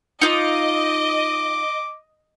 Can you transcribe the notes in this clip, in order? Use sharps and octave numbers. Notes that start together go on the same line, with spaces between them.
D#4 F4 D#5 D6